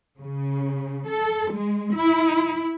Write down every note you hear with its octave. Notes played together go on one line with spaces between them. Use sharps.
C#3
A4
G#3
E4